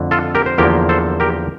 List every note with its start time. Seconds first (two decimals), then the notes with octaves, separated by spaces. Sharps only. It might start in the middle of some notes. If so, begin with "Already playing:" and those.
Already playing: F2 D3 A3
0.11 F4 A4
0.35 G4 A#4
0.46 C5
0.58 E2 D3 F3 A#3 G4 A#4
0.89 A4 C5
1.20 G4 A#4